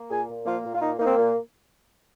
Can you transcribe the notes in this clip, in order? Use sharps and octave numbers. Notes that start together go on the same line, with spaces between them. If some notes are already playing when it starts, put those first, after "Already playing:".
Already playing: A#3
A#2 G#4 G#5
A#2
F3 A#3 F4
A#2
F4
A#3 D#4
A#3 D#4
C4
A#2